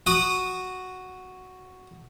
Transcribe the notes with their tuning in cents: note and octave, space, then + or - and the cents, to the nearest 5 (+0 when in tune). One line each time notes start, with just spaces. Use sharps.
F#4 +0 D#6 -25